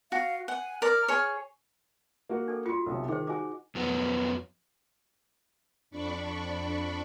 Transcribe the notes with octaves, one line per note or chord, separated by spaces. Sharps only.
F#4 F5
F#5 G#5
A#4 D5 F6
G#4 C#5
A#3 F#4
D4 A4
F4 F#4 C#7
B1 C3
D#3 G#4 C5
D#4 F#4 G#5 D6
F2 F#3 B3
F2 D4 D5 B5 C#6